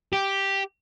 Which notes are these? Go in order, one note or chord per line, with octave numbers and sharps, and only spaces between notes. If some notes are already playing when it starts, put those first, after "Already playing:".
G4